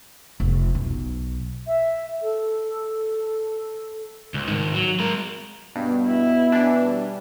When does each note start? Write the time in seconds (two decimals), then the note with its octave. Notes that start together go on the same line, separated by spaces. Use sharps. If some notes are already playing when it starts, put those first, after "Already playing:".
0.40 F1
0.75 B1
1.67 E5
2.22 A4
4.34 C#2
4.48 G#2 D#3
4.74 F#3
5.00 G#3 A#4
5.76 G2 B2
6.07 E4
6.52 E3 D4
6.84 G3